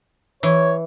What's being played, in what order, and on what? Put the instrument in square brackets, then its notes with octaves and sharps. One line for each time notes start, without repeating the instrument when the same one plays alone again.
[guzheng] E3 [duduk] C#5